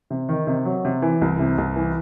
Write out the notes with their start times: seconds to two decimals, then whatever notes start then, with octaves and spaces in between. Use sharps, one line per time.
0.10 C3
0.29 D#3
0.47 C3
0.65 F#3
0.85 C3
1.02 E3
1.21 C2
1.39 C3
1.58 C2
1.76 E3